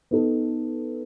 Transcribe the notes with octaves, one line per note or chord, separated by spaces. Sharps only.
B3 D#4 A4